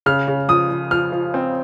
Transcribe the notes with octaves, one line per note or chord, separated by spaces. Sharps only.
C#3 F6
C#3
F3 D#6
F3
F3 F6
F3
C4